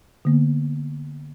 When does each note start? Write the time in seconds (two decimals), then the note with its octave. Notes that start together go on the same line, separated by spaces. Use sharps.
0.25 D3 A#3 B3